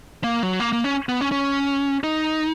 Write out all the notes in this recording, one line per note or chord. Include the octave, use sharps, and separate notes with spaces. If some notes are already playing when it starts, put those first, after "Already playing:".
A#3
F#3
A#3
A#3
C#4
B3
C#4
C#4
D#4